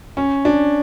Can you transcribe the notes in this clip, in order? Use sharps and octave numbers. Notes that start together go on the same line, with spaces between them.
C#4
D4